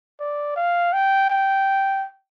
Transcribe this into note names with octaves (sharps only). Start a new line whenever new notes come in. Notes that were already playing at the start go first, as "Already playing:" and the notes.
D5
F5
G5
G5